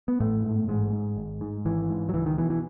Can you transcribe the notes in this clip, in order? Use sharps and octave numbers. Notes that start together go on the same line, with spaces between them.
B3
A1 A2 A3
G#2
A1 G#2 G#3
G#2
G#1
G#2
G#1 E3
G#2
F#3
C#2 E3
D#3
B2 E3
E3